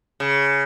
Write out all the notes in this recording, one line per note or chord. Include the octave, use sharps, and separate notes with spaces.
C#3